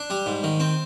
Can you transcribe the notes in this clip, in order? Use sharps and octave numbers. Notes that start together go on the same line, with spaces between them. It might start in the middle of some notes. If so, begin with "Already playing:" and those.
Already playing: D4
G3
G#2
D#3
C4